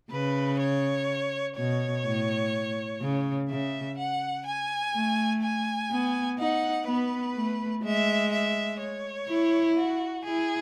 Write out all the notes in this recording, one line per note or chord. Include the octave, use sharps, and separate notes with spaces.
C#3 B4
C#5
B2 C#5
A2
C#3
C#3 E5
F#5
G#5
A3
G#5
B3
D#4 F#5
B3 B4
A3
G#3 E5
E5
C#5
E4
F#4
E4 G#4